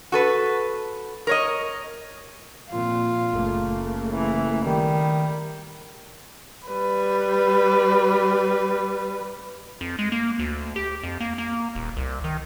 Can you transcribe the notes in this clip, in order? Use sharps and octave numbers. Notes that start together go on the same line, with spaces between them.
F#4 A4 B4
A#4 C#5 D#5
F2 A#2 F4
F#1 C#3 A3 A#3
E3
D#3 G3
G3 B4
F2
G#3
A#3
D2
G4
F2
A#3
A#3
D#1
C2
D#3